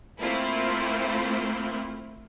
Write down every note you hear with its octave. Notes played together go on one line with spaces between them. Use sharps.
A3 A#3 C4 E4 F4